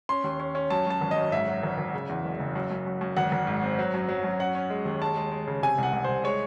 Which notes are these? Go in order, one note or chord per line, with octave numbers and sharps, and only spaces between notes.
C#4 C6
D#2
C#4
C#4
F#2 A5
F#2 A5
G#1
D#5
F#2
G#2 E5
F#3
G#1
G#1
C#3
E2
F#1
F#1
F#2
F#2
F#2
F#2
G#1 F#5
G#1
G#2
C4
F#3
F#2
F#3
F#2
C#4 F#5
C#4
G#3
D#2
G#3 A5
G#3
G#3
C#3
C3 G#5
C2 F#5
C2
C2 C5
G#3 C#5